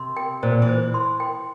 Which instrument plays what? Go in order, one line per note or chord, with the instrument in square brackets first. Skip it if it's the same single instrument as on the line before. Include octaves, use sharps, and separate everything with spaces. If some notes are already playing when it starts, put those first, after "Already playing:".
Already playing: [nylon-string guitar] C3 [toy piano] C6
[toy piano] G5
[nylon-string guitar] A#2 [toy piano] C5
[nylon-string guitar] E3
[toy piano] C5
C6
G5